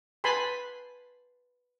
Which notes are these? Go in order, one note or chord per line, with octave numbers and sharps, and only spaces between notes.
B4 G#5 A5 B5 C6